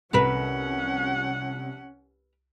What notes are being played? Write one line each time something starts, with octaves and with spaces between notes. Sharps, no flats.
C2 C#4 A#4 B4 F#5 B6 E7